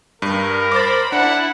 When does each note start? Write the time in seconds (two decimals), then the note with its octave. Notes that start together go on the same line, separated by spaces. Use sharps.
0.22 G2 A#4
0.72 C5 B5 D6 A6
1.12 D4 E4 F#5